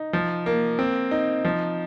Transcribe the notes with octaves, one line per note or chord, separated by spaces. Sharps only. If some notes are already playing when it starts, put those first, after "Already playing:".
Already playing: D#4
F3
A#3
C4
D#4
F3